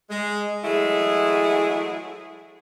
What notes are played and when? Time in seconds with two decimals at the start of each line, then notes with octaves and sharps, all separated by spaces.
0.10 G#3
0.64 E3 F#3 G#3 A3 E4 G#4